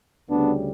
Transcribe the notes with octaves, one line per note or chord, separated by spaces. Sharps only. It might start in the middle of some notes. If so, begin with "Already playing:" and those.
D2 C#3 G3 B3 D4